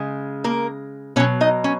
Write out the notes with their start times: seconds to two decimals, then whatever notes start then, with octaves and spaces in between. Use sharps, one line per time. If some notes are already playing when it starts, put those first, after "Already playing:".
Already playing: C#3 G#3
0.44 A#3 A#4
1.16 B2 C#4 C#5
1.20 F#3
1.41 D#4 D#5
1.64 C#4